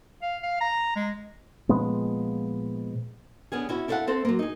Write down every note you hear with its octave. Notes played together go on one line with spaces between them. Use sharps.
F5
F5
A#5
G#3
A#2 F3 G#3 B3
D3 B3 C#4 G#4
C#4 E4 F#4
E4 A4 C#5 D5 F5 F#5
C4 A4 C5
F#3 A#3
D#4 G#4